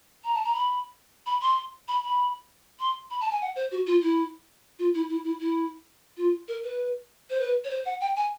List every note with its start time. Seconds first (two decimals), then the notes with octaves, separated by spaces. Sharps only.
0.24 A#5
0.34 A5
0.45 A#5
0.54 B5
1.26 B5
1.42 C6
1.88 B5
2.03 B5
2.80 C6
3.10 B5
3.21 A5
3.31 G#5
3.42 F#5
3.56 C5
3.71 F#4
3.87 F4
4.02 E4
4.79 F4
4.95 E4
5.10 E4
5.24 E4
5.40 E4
6.17 F4
6.48 A#4
6.64 B4
7.30 C5
7.40 B4
7.64 C#5
7.71 C5
7.86 F#5
8.01 G5
8.16 G#5